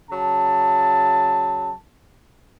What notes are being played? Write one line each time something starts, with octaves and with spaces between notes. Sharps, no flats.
C#3 F#3 A5